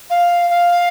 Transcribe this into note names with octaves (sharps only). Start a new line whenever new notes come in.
F5
F5